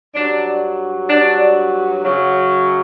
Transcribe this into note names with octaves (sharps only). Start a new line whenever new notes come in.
G2 F#3 D4
G2 F#3 D4
F#2 C#3 F#3